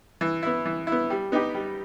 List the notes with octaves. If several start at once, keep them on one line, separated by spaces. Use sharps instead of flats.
E3
B3 E4
E3
E4
B3
G3
B3 D#4 G4
G3